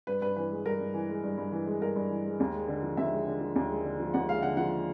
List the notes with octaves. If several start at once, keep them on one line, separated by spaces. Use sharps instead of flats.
G2 B4
G2 B4
E3 B4
G#3
G2 A#4
G2
E3
G#3
G2
G2
E3
G#3
G2 A#4
G2
E3
G#3
D#2
G#3
D3
F3
D#2 E5
G#3
D3
F3
D#2
G#3
D3
F3
D#2 F#5
G#3 F5
D3 F#5
F3 F#5